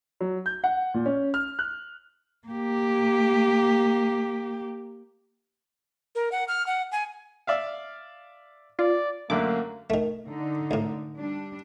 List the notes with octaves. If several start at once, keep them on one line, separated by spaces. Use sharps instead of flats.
F#3
G6
F#5
A#2
C#4
F6
F#6
A#3 G4
A#4
F#5
F6
F#5
G#5
D5 E5 F5
F4 D5
F#2 D3 A3 A#3 D6
D#3 A3
D3 D#4
C#2 A2
G3 D4